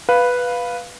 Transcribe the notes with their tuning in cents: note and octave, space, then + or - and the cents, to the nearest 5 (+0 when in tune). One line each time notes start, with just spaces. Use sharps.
B4 +0 F5 +10